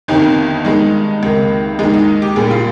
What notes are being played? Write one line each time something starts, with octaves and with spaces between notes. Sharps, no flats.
G1 F2 C3 D#3 D#4
G2 D#3 G#3 D#4
C#2 C3 D#3 A#3
D#2 D#3 G#3 D#4
D#4
G4
A#1 A#2 G3 A#3 G#4
F4